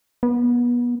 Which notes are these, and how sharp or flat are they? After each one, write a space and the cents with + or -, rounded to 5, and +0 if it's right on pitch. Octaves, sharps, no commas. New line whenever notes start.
B3 -30